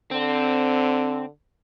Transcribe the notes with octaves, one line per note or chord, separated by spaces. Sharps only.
D3 C4